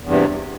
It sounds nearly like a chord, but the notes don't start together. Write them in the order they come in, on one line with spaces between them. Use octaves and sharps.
E2 G2 C3